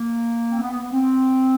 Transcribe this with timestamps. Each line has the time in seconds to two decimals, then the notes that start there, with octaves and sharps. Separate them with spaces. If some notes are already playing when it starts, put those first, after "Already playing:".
Already playing: A#3
0.51 C4
0.61 B3
0.71 B3
0.81 B3
0.92 C4